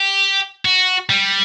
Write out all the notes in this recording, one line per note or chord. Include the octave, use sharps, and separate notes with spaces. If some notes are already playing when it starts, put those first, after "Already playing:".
Already playing: G4
F#4
G3